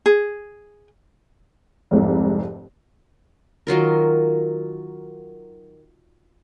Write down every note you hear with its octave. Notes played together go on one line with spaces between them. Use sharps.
G#4
F1 C2 G#2
D#3 F#3 F4 A#4